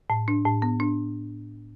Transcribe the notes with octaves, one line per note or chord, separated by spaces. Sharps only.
A2
D4
A2
B3
D4